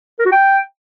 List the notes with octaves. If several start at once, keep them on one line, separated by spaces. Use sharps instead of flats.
A#4
F#4
G5